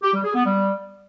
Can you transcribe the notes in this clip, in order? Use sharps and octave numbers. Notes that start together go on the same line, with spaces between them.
G4
G3
G#4
B3
G3